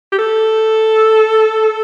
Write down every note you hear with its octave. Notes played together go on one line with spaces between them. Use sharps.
G4
A4